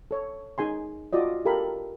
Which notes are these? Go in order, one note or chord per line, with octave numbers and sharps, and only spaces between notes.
A4 C#5
D#4 G#4 G#5 C6
F4 F#4 D5 D#5
G4 A4 A#4 F5 B5